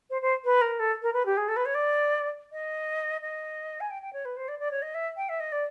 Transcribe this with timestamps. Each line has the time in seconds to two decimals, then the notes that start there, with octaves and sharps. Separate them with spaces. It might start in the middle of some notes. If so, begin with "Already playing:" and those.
0.10 C5
0.21 C5
0.44 B4
0.61 A#4
0.79 A4
1.02 A#4
1.13 B4
1.25 G4
1.37 G#4
1.48 A4
1.56 B4
1.65 C#5
1.74 D5
2.52 D#5
3.21 D#5
3.80 G#5
3.90 G5
4.02 G5
4.12 C#5
4.25 B4
4.36 C5
4.48 D5
4.59 D5
4.71 C#5
4.82 D#5
4.94 E5
5.16 G5
5.28 E5
5.39 D#5
5.52 D5